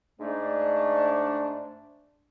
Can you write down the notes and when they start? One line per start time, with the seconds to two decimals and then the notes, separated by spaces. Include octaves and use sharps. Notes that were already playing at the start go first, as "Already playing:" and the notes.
0.20 G#2 A3 D4